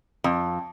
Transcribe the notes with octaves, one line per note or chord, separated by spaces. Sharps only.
F2